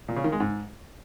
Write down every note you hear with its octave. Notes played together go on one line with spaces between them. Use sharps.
A#2
C#3
D#3
G#3
G#2